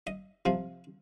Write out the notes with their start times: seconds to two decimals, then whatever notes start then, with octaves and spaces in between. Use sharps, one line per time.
0.07 D#5
0.45 C3 F3